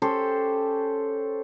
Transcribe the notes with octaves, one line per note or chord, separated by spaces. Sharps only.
C#4 G4 A4 C5